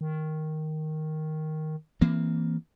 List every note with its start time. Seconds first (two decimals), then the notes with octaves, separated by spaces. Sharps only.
0.01 D#3
2.01 E3 A#3 C4